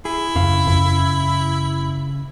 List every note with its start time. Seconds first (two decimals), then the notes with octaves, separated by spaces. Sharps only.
0.05 E4 G#4
0.36 F#2 C#3 F5
0.67 F#2